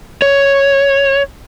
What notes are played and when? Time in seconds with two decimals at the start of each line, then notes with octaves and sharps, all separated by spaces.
0.22 C#5